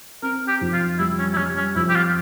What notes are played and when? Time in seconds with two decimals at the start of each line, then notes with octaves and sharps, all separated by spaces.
0.22 C4 A#4
0.48 G4
0.61 F2
0.73 F4
0.99 G3 E4
1.19 C#4
1.33 E4
1.37 G3 C#4
1.57 C#4
1.76 F2 E4
1.89 G4
1.96 F4